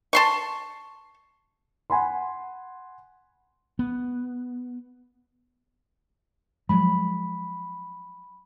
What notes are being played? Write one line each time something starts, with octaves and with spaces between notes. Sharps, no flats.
A5 C6 C#6
F#5 G#5 B5 C6
B3
F3 F#3 G#3 B5